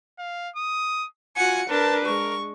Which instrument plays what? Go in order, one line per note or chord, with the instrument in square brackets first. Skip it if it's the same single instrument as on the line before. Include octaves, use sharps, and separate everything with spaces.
[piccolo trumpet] F5
D#6
[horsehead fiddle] F4 F#4 [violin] F#5 C#7 [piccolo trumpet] G#5
[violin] D4 [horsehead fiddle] A#4 B4 [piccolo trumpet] A5
[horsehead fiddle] G#3 [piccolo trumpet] A#4 [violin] C#6